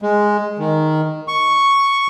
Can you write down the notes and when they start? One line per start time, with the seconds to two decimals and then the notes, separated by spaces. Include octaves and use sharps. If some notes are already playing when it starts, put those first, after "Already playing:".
0.02 G#3
0.59 D#3
1.28 C#6